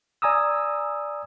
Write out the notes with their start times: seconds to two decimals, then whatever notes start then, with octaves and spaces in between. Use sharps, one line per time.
0.22 D5 G#5 A#5 D#6 E6